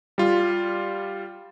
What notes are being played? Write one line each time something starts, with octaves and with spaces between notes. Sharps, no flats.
G3 F4